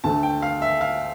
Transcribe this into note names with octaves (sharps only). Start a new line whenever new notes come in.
D2 D3 A3 A5
G5
F5
E5
F5